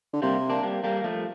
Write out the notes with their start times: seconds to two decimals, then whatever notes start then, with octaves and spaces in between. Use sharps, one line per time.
0.13 D3
0.22 C3 G3 A#3
0.50 A#3 D4
0.63 G3 A#3
0.84 G3 A#3
1.04 F3 A3